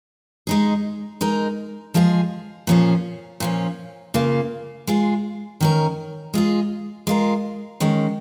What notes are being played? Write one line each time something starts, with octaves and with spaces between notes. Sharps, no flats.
G#3 D#4 G#4
G#3 D#4 A#4
F3 G#3 F4 G#4
A#2 F3 C#4 G#4
A#2 F3 C#4
C#3 A#3 F4
G#3 F4 G#4
D#3 C#4 A#4
G#3 F4 G#4
G#3 F4 A#4
D#3 G#3 C#4 A#4